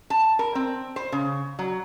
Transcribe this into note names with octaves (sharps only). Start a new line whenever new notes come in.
A5
A#4
C4
C5
C#3
F#3